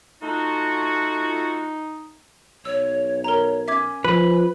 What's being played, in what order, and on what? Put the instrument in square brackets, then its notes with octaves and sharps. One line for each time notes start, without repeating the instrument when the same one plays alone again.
[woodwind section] A3 F4 F#4 [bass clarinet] D#4
[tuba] B1 [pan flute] C#5 [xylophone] E6
[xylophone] A#4 A#5 [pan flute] C#5
[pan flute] C#4 [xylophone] E5 D6 G#6
[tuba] F3 [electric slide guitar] B4 [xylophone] D#7